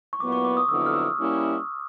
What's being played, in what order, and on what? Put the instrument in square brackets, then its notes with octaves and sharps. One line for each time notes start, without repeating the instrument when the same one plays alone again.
[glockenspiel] C#6
[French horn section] A#2 F#3 B3 E4 [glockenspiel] D6
[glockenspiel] C#6
D6
D#6
[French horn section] F2 D3 F#3 B3 E4 [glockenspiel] E6
[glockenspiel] F6
E6
[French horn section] G3 A#3 C#4 E4